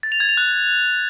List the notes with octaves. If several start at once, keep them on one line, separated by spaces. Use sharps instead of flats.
A6
F7
G#6
F7
F#6